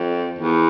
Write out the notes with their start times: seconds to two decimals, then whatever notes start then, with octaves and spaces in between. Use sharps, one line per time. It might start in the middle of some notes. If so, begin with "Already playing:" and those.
Already playing: F2
0.39 E2